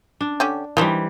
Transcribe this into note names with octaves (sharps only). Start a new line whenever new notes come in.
D4
D3 C#4 G4
D#3 E3 G3 D4 C5